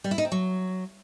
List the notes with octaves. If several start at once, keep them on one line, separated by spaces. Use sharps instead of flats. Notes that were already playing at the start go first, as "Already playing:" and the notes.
G3
E4
D#4
C4
F#3